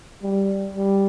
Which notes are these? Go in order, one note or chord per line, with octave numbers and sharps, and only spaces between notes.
G3
G3